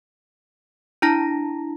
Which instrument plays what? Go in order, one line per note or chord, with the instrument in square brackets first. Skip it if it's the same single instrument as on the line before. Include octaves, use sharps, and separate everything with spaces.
[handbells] D4 E4 A5 A#5 A#6